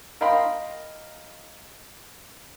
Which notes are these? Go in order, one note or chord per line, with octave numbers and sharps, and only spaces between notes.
A#4 D#5 F5 G5 B5 C6